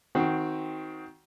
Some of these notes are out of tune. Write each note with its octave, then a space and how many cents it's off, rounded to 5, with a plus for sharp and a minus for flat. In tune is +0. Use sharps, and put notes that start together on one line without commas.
D#3 +20 C4 +0 F#4 +10